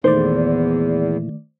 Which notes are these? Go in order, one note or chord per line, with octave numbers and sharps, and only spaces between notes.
E2 A#2 D#3 E3 A3 C5 D5